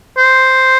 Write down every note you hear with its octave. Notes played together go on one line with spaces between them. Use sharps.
C5